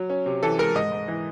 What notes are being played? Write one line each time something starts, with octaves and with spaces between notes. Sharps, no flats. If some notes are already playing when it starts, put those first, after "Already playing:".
Already playing: F#3
C#4
C3
E3 A4
G#3 A#4
G#2 D#5
G#2
E3